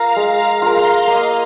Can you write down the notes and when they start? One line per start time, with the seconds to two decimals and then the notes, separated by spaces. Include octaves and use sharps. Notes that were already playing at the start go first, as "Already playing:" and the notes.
Already playing: F4 A#4 F5 A#5
0.16 G#3
0.46 A#5
0.62 F4 A#4
0.77 C6
1.07 A#3 D#5